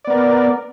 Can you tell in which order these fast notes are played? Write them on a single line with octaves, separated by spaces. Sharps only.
D5 B3 A#4